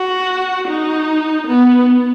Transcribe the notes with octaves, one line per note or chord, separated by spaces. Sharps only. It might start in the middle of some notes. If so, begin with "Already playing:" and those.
Already playing: F#4
D#4
B3